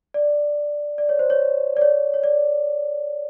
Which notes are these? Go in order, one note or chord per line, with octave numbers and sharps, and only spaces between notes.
D5
D5
C#5
C5
C#5
D5
C#5
C#5
D5